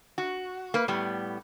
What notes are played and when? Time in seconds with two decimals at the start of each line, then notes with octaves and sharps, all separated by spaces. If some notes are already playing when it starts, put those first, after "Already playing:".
0.18 F#4
0.74 A#3 B4
0.88 A2 G3 B3